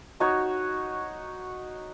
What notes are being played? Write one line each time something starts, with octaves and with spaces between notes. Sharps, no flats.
D#4 F#4 C#5